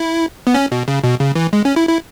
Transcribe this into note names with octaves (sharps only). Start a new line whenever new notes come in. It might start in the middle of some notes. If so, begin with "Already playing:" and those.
Already playing: E4
B3
C#4
B2
C#3
B2
C#3
E3
G#3
C#4
E4
E4